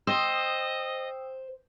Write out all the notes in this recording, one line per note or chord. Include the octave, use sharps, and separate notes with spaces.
C5 D#5 G5 D#6 E6